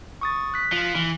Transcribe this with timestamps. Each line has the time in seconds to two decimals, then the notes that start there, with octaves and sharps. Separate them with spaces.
0.21 C#6 D#6 A6
0.54 F#6 B6
0.72 F3
0.95 E3